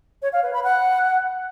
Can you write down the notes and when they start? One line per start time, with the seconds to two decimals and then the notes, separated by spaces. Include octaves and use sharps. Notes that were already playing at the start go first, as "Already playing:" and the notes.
0.22 C#5
0.33 F5
0.43 B4
0.53 B5
0.64 F#5